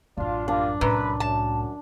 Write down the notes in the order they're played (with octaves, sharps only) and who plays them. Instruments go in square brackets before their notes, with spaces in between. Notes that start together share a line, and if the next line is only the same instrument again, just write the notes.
[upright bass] A1 F#2 [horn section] D4 F4
[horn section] G3 A#3 F4 [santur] D4
[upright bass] C2 A2 [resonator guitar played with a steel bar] F#2 [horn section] B4
[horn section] F#2 [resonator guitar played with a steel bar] A5